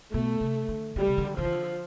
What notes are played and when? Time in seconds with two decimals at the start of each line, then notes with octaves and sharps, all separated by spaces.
0.13 B2 A3
0.41 C3
0.69 D3
0.96 D3 G3
1.07 C3
1.18 D3
1.37 D3 F3
1.45 E3
1.52 D3